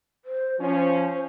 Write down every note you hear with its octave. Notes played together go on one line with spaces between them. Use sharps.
C5
F3 C#4 C5